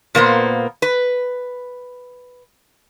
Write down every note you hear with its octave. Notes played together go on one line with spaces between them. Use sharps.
A#2 A#3 B3 C5
B4